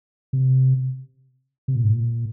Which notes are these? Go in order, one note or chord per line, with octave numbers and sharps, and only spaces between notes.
C3
C3
A#2
G#2
A#2